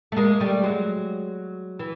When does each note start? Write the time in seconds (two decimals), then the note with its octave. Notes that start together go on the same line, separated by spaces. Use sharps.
0.12 A3
0.17 G#3 A#3
0.40 G3 A3
0.63 F#3 G#3
1.79 E3